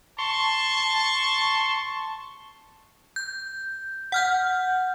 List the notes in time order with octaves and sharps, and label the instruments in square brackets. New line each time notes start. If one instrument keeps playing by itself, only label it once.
[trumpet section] A5 C#6 [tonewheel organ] C6
[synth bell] G6
F#5 F6 G6